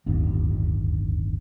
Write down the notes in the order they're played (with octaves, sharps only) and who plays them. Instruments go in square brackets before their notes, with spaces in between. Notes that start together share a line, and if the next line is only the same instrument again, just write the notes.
[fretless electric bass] D1 G1 D#2